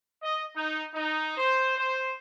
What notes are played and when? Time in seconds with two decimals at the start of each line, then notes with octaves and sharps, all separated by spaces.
0.21 D#5
0.55 D#4
0.93 D#4
1.36 C5
1.76 C5